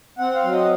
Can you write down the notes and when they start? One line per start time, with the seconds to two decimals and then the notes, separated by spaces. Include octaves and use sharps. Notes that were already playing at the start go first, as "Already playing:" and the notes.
0.18 C4 F#5
0.36 F5
0.44 F#3
0.53 D#5